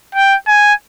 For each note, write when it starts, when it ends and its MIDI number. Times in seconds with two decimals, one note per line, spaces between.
0.15 0.36 79
0.47 0.74 80